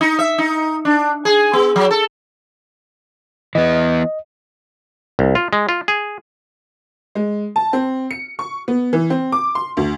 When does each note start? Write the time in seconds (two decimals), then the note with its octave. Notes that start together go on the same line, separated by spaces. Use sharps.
0.01 D#4
0.19 E5
0.38 D#4
0.85 D4
1.25 G#4
1.53 B3
1.76 F#3
1.91 A4
3.55 E3 B3 D#5
5.19 C2
5.35 F4
5.53 G#3
5.69 F4
5.88 G#4
7.15 G#3
7.56 A5
7.73 C4
8.11 C#7
8.39 C#6
8.68 B3
8.93 E3
9.10 C4
9.32 D6
9.55 C6
9.77 D2